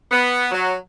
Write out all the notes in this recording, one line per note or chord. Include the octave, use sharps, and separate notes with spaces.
B3
F#3